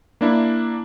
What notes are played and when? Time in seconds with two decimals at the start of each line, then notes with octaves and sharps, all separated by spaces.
0.21 A#3 D4 E4